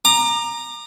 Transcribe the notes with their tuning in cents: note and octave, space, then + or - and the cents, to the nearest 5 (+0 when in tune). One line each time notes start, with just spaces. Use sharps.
A#5 +0 D6 +40